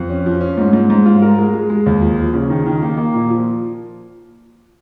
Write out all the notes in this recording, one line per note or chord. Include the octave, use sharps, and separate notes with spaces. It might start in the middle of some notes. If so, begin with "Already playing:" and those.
Already playing: F2
C#4
F3
C#4
G#2
G#2
G#2
F4
A#4
G#3
G#3
G#3
D#2
F3
F3
C#3
D#3
D#3
A#3
A#3
A#2
F3